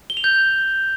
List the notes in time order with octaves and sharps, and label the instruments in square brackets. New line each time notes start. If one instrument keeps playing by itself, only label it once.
[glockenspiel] G7
F7
G6